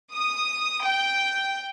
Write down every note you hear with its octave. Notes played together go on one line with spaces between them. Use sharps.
D#6
G5